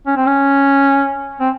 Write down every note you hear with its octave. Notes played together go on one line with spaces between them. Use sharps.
C#4
C4
C#4
C4